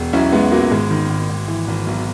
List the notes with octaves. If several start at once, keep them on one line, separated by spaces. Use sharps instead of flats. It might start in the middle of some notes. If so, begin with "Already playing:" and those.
Already playing: E1
B1 C#4 E4
B1 G#3 B3
A#2 F#3 A#3
G#1 G#3
D#3
G#1
G#1
E3
G#1
B1